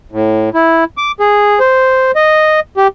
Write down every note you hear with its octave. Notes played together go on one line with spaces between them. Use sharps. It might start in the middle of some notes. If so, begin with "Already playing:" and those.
A2
E4
D6
G#4
C5
D#5
G4